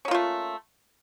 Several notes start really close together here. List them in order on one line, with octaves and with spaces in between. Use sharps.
C#4 A#3 F4 A3